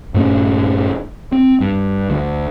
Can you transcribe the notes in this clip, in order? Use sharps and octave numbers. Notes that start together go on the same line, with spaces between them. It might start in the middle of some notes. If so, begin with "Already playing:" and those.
G2 A#2 A3 C#4
C4
G2
D2